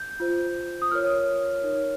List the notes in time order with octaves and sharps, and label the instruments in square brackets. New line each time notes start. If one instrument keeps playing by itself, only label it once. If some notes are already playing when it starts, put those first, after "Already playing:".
Already playing: [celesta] G6
F4 C5
D#6
F4 A#4 C#5 F6
D#4 A#4 C#5